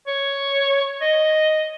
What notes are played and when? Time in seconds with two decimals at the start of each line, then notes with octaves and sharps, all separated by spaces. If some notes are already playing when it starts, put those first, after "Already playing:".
0.08 C#5
1.02 D#5